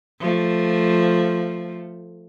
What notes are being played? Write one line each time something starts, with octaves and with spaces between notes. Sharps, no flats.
F3 A3